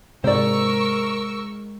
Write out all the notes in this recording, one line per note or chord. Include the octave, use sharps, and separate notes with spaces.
G#2 C3 G#3 A#4 C5 D5 C#6 E6